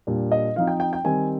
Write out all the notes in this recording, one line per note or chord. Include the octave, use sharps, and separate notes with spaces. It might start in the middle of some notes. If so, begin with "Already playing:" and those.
A#2 G3 D4
D#5
F3 C4 D#4 F5
G5
G5
G5
D#3 G3 C4 G#5